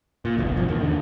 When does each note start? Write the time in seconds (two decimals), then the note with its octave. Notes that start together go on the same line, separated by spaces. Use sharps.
0.25 A#2
0.37 F#1 B1 E2 B2
0.56 G2 B2 F3
0.68 D#2 D#3
0.80 E2 D3